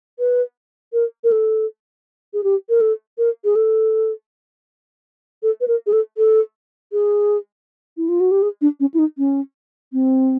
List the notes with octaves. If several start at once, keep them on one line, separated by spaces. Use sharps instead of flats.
B4
A#4
A#4
A4
G#4
G4
A#4
A4
A#4
G#4
A4
A4
B4
A#4
G#4
A4
A4
G#4
E4
F4
F#4
G4
G#4
D4
C#4
E4
D#4
C#4
C4